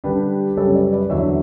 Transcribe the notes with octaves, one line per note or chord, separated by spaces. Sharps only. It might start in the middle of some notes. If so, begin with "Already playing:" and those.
D3 G3 D4 G4 B4
F#2 C#3 G3 A4 C#5
B4 D5
B4 D5
E2 D3 F#3 C#5 E5